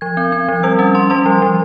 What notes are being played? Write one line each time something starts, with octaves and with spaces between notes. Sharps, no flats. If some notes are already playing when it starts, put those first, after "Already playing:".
F3 G#6
C4 G6
C4 G#6
F3
G3 E6
C#4
C#4 C6
G3 C6
F3
F3